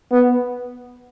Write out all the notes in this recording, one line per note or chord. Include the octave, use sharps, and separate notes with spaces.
B3